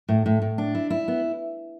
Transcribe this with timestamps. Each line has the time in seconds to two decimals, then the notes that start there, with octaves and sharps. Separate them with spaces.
0.09 A2
0.26 A2
0.42 A2
0.58 D4
0.75 E4
0.90 E4
1.08 B3